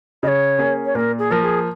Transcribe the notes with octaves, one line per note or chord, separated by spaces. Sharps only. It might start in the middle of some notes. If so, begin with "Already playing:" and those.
C#3 C#5 D#5
A#3 C#4 G#4
C#5
A#2 A#4
G#4
F3 A#3 A#4
G#4